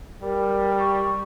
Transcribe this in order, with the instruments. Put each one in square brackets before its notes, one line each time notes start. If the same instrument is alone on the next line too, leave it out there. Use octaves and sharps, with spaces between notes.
[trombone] G3 [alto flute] A#4
[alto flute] C#6